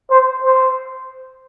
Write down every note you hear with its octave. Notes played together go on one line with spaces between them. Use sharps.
C5
C5